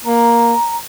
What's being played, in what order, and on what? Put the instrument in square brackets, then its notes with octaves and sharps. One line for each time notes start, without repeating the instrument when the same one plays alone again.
[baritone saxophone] A#3 [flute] A#5